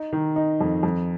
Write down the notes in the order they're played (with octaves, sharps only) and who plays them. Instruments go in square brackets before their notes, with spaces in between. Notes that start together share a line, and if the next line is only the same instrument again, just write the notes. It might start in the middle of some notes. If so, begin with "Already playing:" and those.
Already playing: [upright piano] D#4
D#3
D#4
F2
F2